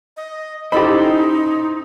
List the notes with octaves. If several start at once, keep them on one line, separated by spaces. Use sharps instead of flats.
D#5
C#4 D#4 E4 G4 A4 C5 D#5 B5